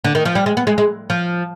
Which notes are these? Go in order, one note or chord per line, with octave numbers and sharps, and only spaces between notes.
D3
D#3
F3
G3
G#3
B3
G#3
G#3
F3